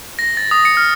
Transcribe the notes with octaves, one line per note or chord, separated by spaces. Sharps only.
A#6
A6
D#6
C#7
F6